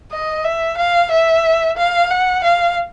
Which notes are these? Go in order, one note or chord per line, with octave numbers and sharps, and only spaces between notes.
D#5
E5
F5
E5
F5
F#5
F5